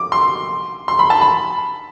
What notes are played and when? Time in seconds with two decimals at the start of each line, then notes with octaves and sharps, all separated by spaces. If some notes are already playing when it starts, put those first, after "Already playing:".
Already playing: D6
0.12 C6
0.88 C6
0.99 B5
1.10 A5
1.21 B5